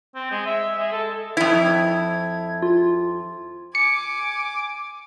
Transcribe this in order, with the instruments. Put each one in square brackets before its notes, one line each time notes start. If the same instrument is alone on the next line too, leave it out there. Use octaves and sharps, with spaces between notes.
[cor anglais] C4
G#3
E5
G#3
A4
[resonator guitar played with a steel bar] F2 E4 [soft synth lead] G#6
[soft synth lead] F4
[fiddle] G#5 [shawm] D6 [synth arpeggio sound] C#7